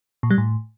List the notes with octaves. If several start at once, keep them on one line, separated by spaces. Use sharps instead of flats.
A#2
G3
A2